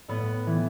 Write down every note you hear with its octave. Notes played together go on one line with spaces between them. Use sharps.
A2 B3
E3